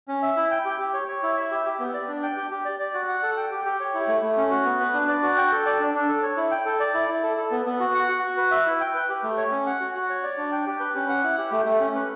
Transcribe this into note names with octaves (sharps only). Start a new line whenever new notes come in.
C#4
E5
E4
G5
G4
G4
C#5
C#5
E4
E5
G4
G4
B3
D5
D4
G5
G4
G4
D5
D5
F#4
F#5
A4
G5
G4
G4
C#5
E4
A3
A3
C#4
F#4
B3
B4
D4
D5
F#4
G5
A4
D5
D4
D4
A4
C#5
E4
G5
A4
D5
E4
E4
A4
A4
B3
B3
F#4
F#5
F#4
F#4
B4
E5
E4
G5
B4
G4
A3
C#5
C#4
F#5
F#4
F#4
C#5
D5
D4
G5
G4
B4
C#4
F#5
E4
G4
A3
A3
C#4
B4